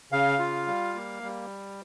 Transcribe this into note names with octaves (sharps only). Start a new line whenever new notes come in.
C#3 F5
F4
G3
A#3
G3